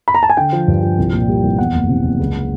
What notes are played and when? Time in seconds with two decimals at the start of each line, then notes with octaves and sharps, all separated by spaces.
0.08 B5
0.15 A#5
0.23 A5
0.30 G#5
0.37 D3 G5
0.53 F3
0.68 G2
0.83 F3
0.98 C2
1.13 A#2
1.29 G3
1.43 C2
1.58 E2 F#5
1.74 F#1
1.89 C3
2.04 F#1
2.19 C#2